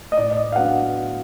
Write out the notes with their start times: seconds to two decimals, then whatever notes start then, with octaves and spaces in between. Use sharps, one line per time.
0.12 D#5
0.17 A2 D5
0.31 D5
0.37 D#5
0.52 F5
0.56 F#3 B3 D4 F#5